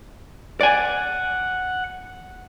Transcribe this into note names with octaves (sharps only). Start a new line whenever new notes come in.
D5 F#5 G#5